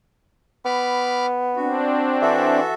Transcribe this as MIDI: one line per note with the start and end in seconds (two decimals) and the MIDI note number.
0.65 1.83 59
0.65 1.26 83
0.65 1.26 86
0.65 1.26 89
1.56 2.60 60
1.56 2.60 62
1.56 2.17 66
2.22 2.66 52
2.22 2.74 66
2.22 2.74 69
2.22 2.74 76